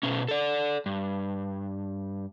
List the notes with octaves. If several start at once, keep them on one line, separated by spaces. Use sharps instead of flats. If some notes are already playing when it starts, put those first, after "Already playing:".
B2 C#4
A4 D5
G2